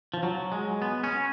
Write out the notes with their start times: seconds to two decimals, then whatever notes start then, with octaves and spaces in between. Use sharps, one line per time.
0.14 F3
0.23 F#3
0.52 G#3
0.82 B3
1.04 C#4